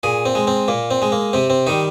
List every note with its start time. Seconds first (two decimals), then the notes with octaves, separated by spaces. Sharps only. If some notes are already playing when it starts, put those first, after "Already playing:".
0.03 A#2 G#4
0.25 C4
0.35 G#3
0.47 C4
0.68 A#2 A#3
0.91 C4
1.02 G#3
1.12 A#3
1.33 C3 C4
1.50 C4
1.67 D#3 G3 D#4